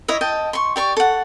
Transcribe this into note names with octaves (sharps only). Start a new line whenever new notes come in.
E4 C#5 D#5 E5
D#5 G5 A5
C6 C#6
G4 D5 C#6
A4 F#5